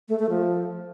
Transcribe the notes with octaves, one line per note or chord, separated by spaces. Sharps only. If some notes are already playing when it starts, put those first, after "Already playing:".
A3
A3
F3